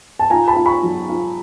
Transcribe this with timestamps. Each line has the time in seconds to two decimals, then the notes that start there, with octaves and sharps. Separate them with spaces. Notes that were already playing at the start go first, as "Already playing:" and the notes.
0.19 A5
0.30 F4 G#5 A#5
0.48 A5 B5
0.56 F4
0.66 B5 C#6
0.83 F#3
1.09 F4